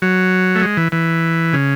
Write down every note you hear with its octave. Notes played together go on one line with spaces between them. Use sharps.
F#3
A3
G#3
E3
E3
C#3